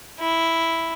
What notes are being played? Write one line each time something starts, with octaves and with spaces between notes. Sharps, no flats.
E4